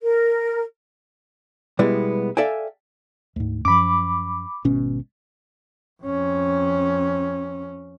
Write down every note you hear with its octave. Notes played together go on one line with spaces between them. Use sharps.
A#4
B2 G3 G#3 B3 E4
A4 D5 E5 F5 G5 G#5
D2 G#2
F#2 F3 B5 D6
G#1 B2 C#4
F2 C#4